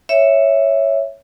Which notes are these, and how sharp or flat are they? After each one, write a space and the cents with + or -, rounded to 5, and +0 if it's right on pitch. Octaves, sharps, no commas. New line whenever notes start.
C#5 +0 E5 +0